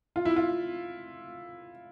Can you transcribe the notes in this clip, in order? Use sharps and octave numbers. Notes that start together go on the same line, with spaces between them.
F4
E4
F4